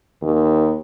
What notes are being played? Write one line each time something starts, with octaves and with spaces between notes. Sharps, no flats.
D#2